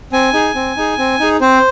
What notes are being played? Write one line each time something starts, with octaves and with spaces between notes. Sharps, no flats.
C4 G#5
D#4 G#4
C4
D#4 G#4
C4
D#4 G#4
C4 C5